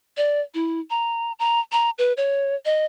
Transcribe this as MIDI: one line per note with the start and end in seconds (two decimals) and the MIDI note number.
0.17 0.41 74
0.54 0.80 64
0.90 1.32 82
1.39 1.60 82
1.72 1.90 82
1.98 2.13 71
2.17 2.55 73
2.65 2.85 75